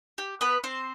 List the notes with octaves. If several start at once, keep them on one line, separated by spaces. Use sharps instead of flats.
G4
B3 B4
C4 C5